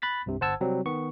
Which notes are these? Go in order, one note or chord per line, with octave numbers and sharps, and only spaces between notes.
B5 F#6 A6 B6
C2 G2 C3
G1 C5 F#5 A5 E6 G#6
C3 F#3 G3 C4
D#3 B3 C#6